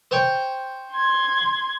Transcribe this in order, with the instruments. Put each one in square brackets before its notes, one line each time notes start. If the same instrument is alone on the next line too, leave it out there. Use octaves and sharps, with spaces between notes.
[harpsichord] C5 C#5 G5
[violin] C6 G#6